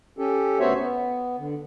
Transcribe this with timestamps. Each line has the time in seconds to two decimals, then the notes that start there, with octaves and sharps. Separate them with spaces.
0.18 C#4 G4 A4
0.60 D2 B3 F#4 C5 C#5 E5
0.79 B3
1.38 D3